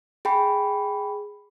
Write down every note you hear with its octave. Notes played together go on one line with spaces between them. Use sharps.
G#4 G5 B5